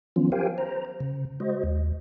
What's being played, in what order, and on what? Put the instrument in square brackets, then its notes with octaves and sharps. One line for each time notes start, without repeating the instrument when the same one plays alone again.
[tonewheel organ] D#3 F3 F#3 B3 C#4 F4
G4 A#4 C5 F5 G5 G#5
C5 A#5
C#3
G#3 F#4 C5 D#5
D#2